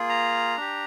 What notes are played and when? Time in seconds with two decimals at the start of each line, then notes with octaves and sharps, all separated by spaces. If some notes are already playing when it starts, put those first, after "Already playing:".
Already playing: A#3 F4 G#4
0.09 A#5
0.57 D4 G4